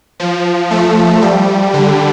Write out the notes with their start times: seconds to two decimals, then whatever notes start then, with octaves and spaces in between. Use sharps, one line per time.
0.20 F3
0.71 A3
1.22 G3
1.74 D3